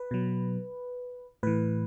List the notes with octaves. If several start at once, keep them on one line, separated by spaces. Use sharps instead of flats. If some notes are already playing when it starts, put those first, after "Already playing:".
Already playing: B4
B2 F#3
A2 E3 B4